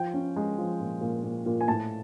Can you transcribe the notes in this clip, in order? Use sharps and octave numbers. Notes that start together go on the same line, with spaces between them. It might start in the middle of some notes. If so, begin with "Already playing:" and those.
Already playing: F3 G5
C#4
G#3
F3
A#2
A#2
A#2
A#2
G#5
A2 A5